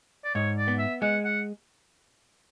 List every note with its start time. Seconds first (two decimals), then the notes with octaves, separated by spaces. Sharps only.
0.24 D5
0.35 G#2 C#5
0.57 D5
0.68 B3
0.79 E5
1.02 G#3 F#5
1.25 F#5